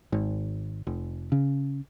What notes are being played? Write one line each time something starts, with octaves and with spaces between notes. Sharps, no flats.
G#1
F1
C#3